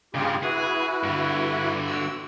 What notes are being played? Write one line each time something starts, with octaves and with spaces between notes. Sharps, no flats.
G2 C#3 F4 G4 G#4
E4 F#4 G#4 B4
G2 D3
F#4 E6